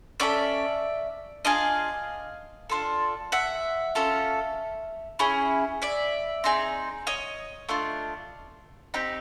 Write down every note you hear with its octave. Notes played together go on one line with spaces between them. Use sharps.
C#4 F#4 A4 D5 E5
D4 F4 G#4 D#5 F5
D4 F4 A4
E5 F#5
C#4 F4 A4
C#4 E4 G#4
D5 E5
C4 D#4 G#4
C#5 D#5
A3 D4 F4
C4 D#4 G4